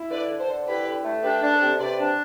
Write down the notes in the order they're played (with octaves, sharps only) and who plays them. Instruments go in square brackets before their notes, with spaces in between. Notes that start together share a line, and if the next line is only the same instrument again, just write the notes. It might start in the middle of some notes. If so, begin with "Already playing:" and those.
Already playing: [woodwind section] E4
[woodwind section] D3 [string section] B4 D5
[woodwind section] D3
[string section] A4 C5
[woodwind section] D3
[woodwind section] E4 [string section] G4 B4
[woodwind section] D3
A3
[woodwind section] D4 [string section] G4 B4
[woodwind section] D4
[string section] A4 C5
[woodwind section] C3
[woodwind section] C3 [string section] B4 D5
[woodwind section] D4